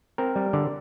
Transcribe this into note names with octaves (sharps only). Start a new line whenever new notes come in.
C4 A#4
G3
D3 D5